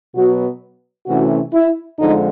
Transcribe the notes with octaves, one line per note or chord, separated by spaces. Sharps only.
B2 F#3 B3 F#4
C3 E3 A3 C#4 F#4
E4
F2 D3 F3 G#3 D#4